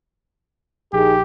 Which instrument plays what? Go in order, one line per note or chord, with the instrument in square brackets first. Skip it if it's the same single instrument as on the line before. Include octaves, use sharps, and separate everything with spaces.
[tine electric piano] A#1 [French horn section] D#3 D#4 G#4 [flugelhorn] G4